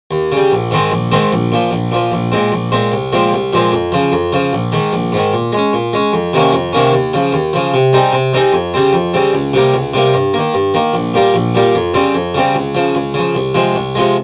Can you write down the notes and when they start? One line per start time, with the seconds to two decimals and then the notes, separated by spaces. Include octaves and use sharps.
0.11 D#2
0.32 C#3 G3
0.52 A#1
0.71 G#2 D#3 G#3 C4
0.92 A#1
1.12 G#2 D#3 G#3 C4
1.32 A#1
1.52 A#2 F3
1.71 A#1
1.92 A#2 F3
2.12 A#1
2.32 A#2 G#3 C4
2.52 A#1
2.72 A#2 G#3 C4
2.92 C2
3.13 A#2 F3 G#3 C4
3.32 C2
3.53 A#2 F3 G#3 C4
3.72 F2
3.92 C#3 F3
4.12 F2
4.33 C#3 F3
4.53 A#1
4.72 G#2 D#3
4.93 A#1
5.12 G#2 D#3
5.33 A#2
5.52 G#3 C#4
5.73 A#2
5.93 G#3 C#4
6.13 F2
6.33 C3 D#3 A#3 C#4
6.53 F2
6.73 C3 D#3 A#3 C#4
6.93 D#2
7.14 C#3 F3
7.33 D#2
7.53 C#3 F3
7.74 C3
7.93 G3 C4 D#4 G#4
8.13 C3
8.33 G3 C4 D#4 G#4
8.53 F2
8.74 C#3 G3 C4
8.93 F2
9.14 C#3 G3 C4
9.33 C#2
9.54 C3 G3 A#3
9.74 C#2
9.94 C3 G3 A#3
10.14 G2
10.34 D#3 A#3
10.54 G2
10.74 D#3 A#3
10.94 A#1
11.14 A#2 G3 A#3
11.34 A#1
11.55 A#2 G3 A#3
11.75 F2
11.94 C#3 G3 C4
12.15 F2
12.35 C#3 G3 C4
12.55 C#2
12.75 C#3 F3
12.95 C#2
13.14 C#3 F3
13.35 C2
13.54 C3 F3 G#3
13.75 C2
13.95 C3 F3 G#3